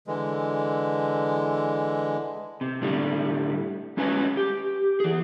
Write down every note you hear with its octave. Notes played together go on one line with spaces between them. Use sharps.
D3 E3 G#3
C3
A2 D3 G3
G#3 C#4 F#4 B4 C#5 G#5
G4
E3 G#4